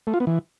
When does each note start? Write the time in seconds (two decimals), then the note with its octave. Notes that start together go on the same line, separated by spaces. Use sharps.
0.07 A3
0.14 F4
0.20 B3
0.27 E3